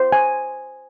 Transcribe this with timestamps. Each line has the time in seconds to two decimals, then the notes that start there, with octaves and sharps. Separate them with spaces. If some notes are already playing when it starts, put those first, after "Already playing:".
Already playing: C5
0.12 G#5